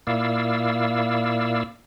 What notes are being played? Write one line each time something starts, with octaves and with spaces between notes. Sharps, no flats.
A#2 A#3 E4 D5 F5 E6